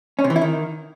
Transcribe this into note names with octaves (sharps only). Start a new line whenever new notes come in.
C#4
C3
E3
E4
D#3